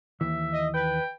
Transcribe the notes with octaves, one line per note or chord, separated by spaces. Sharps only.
D#2 E3 E5
D#5
B4 G5